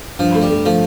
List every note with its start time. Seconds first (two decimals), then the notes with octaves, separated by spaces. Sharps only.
0.19 G2 F3
0.35 A3
0.42 G3
0.50 A3
0.65 F3 A3